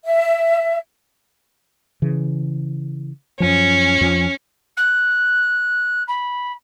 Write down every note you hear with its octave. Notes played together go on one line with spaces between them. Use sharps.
E5
C#3 E3
F#2 F3 C#4
F2 F3
F#6
B5